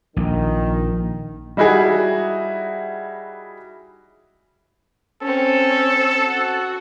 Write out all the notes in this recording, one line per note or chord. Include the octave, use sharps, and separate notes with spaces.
A#1 D#3
G3 D#4 E4 F#4 G#4
C4 C#4 A4
F#4